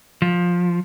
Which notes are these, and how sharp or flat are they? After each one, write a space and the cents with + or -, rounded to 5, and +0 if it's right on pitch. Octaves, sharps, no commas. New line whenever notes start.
F3 +15